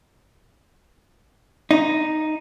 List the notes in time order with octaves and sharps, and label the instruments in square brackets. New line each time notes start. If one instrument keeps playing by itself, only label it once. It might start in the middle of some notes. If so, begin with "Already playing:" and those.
[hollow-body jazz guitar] D#4